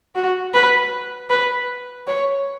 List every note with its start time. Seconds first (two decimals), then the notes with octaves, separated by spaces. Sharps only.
0.15 F#4
0.54 B4
1.30 B4
2.07 C#5